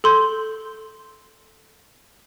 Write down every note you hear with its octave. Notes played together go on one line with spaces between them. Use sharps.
A4 C6 G6